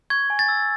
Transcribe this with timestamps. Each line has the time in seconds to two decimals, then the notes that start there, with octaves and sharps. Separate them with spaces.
0.10 C#6 G#6
0.30 G#5
0.39 A6
0.48 E6